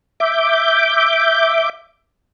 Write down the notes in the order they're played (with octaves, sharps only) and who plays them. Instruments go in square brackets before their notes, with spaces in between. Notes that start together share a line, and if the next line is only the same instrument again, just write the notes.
[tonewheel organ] E5 D6 G6